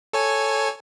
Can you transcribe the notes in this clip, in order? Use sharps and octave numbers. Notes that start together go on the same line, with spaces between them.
A4 C#5 G#5